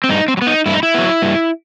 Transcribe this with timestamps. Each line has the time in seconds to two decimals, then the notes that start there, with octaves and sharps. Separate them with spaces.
0.04 C4
0.09 G2 D#4
0.28 C4
0.37 F#3
0.42 B3
0.47 D#4
0.66 G2 E4
0.74 D#4
0.83 E4
0.94 F#3 B3
1.22 G2